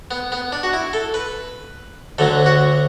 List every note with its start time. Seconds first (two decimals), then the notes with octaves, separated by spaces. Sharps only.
0.11 B3
0.32 B3
0.52 D4
0.63 F#4
0.73 E4
0.93 A4
1.14 B4
2.18 D2 D3 F#3 A4
2.46 F#4